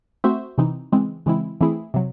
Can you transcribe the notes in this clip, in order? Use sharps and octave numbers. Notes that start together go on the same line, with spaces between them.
A3 C4 F#4 C5 E5
C3 E3 C4 D#4
C#3 E3 G#3 C4
C#3 E3 G#3 C4 E4
E3 A3 C4 E4 G#4
C3 F#3